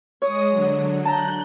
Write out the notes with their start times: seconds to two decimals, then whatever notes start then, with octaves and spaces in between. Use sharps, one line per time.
0.22 G#3 C#5 D#6
0.51 D3 F#3
1.05 A5 A#5 F#6 G6